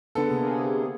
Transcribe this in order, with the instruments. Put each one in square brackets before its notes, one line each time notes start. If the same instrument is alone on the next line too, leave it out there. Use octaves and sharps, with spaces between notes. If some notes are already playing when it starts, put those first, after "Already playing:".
[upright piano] D3 B3 A4
[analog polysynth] C3 A#3 G#4